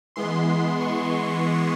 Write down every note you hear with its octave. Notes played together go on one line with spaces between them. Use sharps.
E3 G#3 B3 C6
C#6